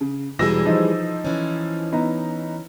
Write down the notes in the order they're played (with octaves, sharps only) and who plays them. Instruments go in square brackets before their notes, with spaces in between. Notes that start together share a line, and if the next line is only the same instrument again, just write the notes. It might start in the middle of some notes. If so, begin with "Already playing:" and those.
[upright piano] C#3
[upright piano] E1 E6 A#6 [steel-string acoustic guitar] E3 G3 G#4
[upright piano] F3 D#4 C5
[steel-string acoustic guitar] E3 C#4
[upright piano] B3 D#4 A#5